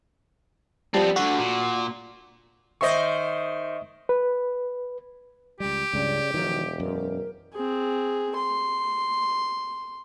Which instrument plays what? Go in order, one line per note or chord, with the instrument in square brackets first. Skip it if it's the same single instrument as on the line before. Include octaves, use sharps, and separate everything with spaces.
[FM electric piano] F3 G3 A5 [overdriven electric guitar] B3 C4
[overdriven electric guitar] D2 D3 [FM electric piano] F#4
[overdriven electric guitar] A#2
[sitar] D#3 C5 [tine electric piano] D#5 E5 C#6
[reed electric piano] B4
[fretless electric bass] C#2 G3 [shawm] G4
[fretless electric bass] C#2 G2 [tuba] C#3 [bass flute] D5
[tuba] E1 [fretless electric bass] D#3 F#3 [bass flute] F3
[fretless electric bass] F#2 [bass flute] A#4
[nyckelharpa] C4 G#4
C6